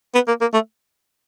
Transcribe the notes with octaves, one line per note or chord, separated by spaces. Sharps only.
B3
A#3
A#3
A3